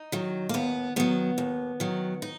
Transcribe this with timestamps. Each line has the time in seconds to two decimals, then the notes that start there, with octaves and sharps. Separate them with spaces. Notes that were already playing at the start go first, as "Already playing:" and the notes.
Already playing: D#4
0.12 D#3 F#3
0.49 A#3
0.54 D#2 B3
0.96 D#3 F#3 B3
1.38 D#2
1.80 D#3 F#3
2.22 D#4